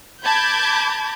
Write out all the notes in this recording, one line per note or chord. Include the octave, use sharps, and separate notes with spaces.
A5 B5 D6 G6 G#6